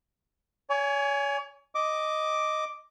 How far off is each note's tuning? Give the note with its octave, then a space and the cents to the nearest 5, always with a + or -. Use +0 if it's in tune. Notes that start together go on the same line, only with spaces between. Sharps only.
C#5 +35 G#5 +0
D#5 +0 D6 +0